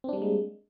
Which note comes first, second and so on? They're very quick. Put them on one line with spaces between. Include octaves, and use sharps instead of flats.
C4 D4 G3 A#3 G#3